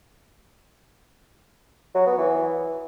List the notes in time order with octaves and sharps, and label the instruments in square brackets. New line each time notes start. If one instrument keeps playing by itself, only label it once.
[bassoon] F#3
B3
E3